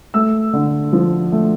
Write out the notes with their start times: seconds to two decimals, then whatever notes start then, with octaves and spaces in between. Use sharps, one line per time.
0.14 A3 E6
0.53 D3
0.93 F3
1.32 A3